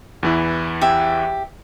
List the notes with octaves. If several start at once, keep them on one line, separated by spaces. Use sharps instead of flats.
E2 E3 E4
G4 E5